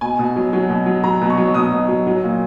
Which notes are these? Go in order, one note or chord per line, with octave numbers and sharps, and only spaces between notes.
B2 G#5
B2
F#3
F#3
B2
F#3
F#3 A#5
B2
C#6
F#3
B2 D#6
B2
F#3
F#3
A#2